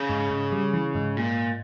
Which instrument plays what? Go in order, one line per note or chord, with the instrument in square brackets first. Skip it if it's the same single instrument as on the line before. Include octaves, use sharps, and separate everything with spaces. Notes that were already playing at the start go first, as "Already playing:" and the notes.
Already playing: [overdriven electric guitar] C#3
[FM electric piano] G#2
G#2
G3
E3
G#2
[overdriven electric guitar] A#2